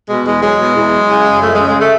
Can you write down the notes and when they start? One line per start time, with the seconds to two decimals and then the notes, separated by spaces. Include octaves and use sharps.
0.09 B2 G#3
0.24 E2 G#3
0.42 F#3 G#3
0.59 B2
0.74 E2
0.92 F#3
1.08 C#3
1.25 F#2
1.42 F3 A3
1.54 G#3
1.58 C#3
1.67 G#3
1.80 A3